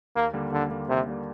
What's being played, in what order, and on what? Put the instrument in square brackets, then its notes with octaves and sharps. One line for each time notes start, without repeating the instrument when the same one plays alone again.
[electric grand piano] D#2 [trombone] A#3
[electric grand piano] D3 G3 A#3
[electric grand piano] D#2 [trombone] D3
[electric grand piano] D3 G3 A#3
[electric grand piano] D#2 [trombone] C3
[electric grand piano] D3 G3 A#3